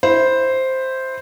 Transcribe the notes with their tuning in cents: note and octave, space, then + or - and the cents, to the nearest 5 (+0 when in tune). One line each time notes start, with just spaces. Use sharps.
E4 +0 C5 +0